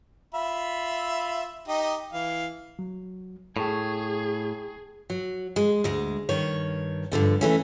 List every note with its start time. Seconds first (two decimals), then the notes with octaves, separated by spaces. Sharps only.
0.34 F4 E5 B5
1.68 D#4 G4 D#5
2.13 E3 F5
2.79 F#3
3.57 A2 G#4 G5 A5 C#6
5.10 F#3
5.56 G#3
5.84 D2 G#3
6.29 G2 D#3 C#5
7.12 G2 B2 D3 F3
7.41 E3 A3 C#4